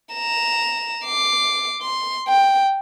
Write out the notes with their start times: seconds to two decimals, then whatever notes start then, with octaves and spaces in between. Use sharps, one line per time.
0.14 A#5 E7
1.05 D6 C7
1.82 C6
2.28 G5